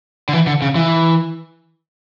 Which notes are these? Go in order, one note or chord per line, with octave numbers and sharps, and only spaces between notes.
D3
E3
D3
C#3
E3